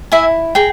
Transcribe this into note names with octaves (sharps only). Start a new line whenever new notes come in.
E4 E5 G#5
G#4 G5 A#5